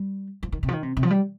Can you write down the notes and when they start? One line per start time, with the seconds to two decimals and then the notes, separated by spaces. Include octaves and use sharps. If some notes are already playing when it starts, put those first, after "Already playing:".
Already playing: G3
0.43 F3
0.52 D#3
0.63 C3
0.69 F3
0.73 D#3
0.83 C3
0.97 C3
1.03 F3
1.10 G3